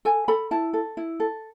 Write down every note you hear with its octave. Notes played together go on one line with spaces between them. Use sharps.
A4 G#5
A4 B5
E4 A5
A4
E4
A4